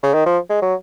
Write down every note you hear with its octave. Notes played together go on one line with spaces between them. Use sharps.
C#3
D#3
F3
G#3
F#3